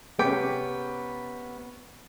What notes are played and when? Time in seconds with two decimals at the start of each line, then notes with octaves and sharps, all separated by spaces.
0.19 C3 B3 C#4 G#4 G5